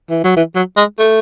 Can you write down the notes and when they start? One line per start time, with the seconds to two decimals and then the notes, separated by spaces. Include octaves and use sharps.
0.10 E3
0.24 F#3
0.36 E3
0.55 F#3
0.77 G#3
0.99 A3